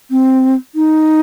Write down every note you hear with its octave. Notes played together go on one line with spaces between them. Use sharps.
C4
D#4